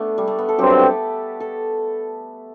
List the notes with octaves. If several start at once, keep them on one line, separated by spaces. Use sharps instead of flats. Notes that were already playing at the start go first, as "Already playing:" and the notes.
Already playing: A3 B3 D4
G3
A3
B3
A4
G2 F#3 C4 G4
B4
A4
A4